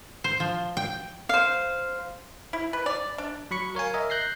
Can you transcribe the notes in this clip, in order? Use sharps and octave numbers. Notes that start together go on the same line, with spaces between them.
C5
F3
G5
C5 F5
E4
B4
D5
D4
F#3 B5 C#6 C#7
A#4 C#5 F5 G#5
A#4 D#5 E5
F#6 G6 A#6 C7